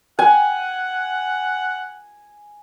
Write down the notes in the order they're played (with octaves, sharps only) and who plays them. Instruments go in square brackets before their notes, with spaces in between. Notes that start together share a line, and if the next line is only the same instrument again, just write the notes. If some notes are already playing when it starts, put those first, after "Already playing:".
[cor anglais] F#5 [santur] G#5